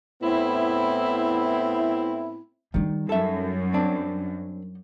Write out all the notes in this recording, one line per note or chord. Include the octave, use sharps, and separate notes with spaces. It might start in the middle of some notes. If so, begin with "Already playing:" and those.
A2 B3 C4 E4
D#3 G3 D#4
F#2 A4 E5
C4 D4